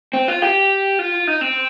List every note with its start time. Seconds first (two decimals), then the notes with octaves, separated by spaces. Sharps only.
0.14 C4
0.28 F4
0.42 G4
0.99 F4
1.27 D#4
1.41 C4